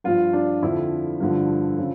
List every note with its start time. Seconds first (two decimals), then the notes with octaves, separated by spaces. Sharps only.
0.04 G2 F3 F4
0.33 D4
0.62 F2 D3 F3 E4
1.20 G2 D3 F3
1.78 C#3 F3